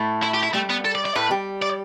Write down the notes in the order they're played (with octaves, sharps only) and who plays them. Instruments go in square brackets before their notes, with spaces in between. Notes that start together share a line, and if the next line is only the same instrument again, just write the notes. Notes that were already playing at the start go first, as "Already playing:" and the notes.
Already playing: [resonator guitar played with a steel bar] A2 A3
[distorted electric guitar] E4
G4
E4
[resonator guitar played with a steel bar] G3 [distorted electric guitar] A3
[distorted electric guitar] B3
A4
D5
D5
[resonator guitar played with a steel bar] A2 A3 [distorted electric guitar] B4
[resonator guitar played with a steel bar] G3 G4
[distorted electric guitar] D5